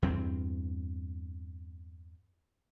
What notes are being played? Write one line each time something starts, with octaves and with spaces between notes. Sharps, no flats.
E2 G2 C4